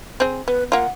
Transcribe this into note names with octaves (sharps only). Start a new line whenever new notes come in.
C4 G#4
B3 B4
A#3 F4 F#5